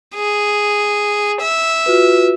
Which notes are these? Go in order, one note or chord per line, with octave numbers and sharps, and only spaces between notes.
G#4
E5
F4 F#4 B4